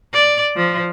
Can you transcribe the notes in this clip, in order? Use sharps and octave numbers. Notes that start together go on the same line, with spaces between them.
D5
F3